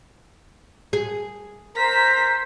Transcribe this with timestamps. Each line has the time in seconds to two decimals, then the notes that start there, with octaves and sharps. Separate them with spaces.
0.93 G#4
1.76 A#4 C5 A#5 B6